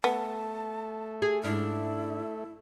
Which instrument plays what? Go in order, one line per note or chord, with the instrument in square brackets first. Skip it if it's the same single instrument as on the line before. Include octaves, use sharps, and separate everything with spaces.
[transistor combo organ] A3 [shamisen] B3 [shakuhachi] A5
[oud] G#4
[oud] G#2 D4 F5 [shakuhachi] E4